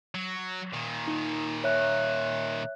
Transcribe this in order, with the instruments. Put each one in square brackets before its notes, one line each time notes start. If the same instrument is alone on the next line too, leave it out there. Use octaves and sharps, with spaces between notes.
[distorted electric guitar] F#3
A#2 D#3
[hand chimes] D#4
C#5 E5 F#6